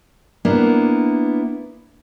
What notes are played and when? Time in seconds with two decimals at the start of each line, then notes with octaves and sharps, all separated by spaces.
0.45 A#3 B3 D4 E4